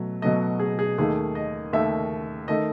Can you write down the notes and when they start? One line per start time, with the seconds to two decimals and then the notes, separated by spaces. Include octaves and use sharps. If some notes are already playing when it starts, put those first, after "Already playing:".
Already playing: B2 F#3 A3
0.22 B2 F#3 A3 D#5
0.60 G#4
0.79 G#4
0.98 D#2 D#3 A3 G#4
1.35 D#5
1.73 D#2 D#3 A3 E5
2.48 D#3 A3 D#5